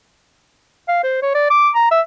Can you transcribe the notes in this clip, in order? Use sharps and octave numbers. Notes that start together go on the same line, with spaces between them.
F5
C5
C#5
D5
D6
A#5
E5